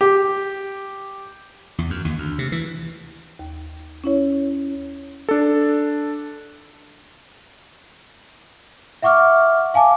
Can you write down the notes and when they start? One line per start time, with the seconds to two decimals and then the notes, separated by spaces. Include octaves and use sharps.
0.01 G4
1.78 E2
1.90 F#2
2.05 D#2
2.18 D2
2.39 C3
2.52 E3
3.39 D#2
4.04 C#4 E4 C#5
5.29 D4 A4
9.02 E5 F#5 C#6 D6 F6
9.74 F5 G#5 A5 D6